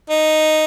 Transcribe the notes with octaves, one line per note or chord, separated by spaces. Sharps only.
D#4